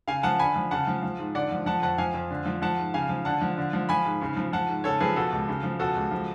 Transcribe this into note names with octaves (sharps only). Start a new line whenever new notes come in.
C#3 F5 G#5
F3 F#5 A5
D3 G#5 B5
F3
C#3 F#5 A5
F3
F3
G#2
D3 D5 F#5
F3
F3 F#5 A5
F2 F#5 A5
F3 F5 G#5
F2
D3
F3
F3 F#5 A5
G#2
C#3 F5 G#5
F3
D3 F#5 A5
F3
D3
F3
F3 G#5 B5
G#2
C#3
F3
F3 F#5 A5
G#2
C#3 A4 C#5
F3 G#4 B4
B2 F#4 A4
C#2
C#3
F3
B2 F#4 A4
C#2
F3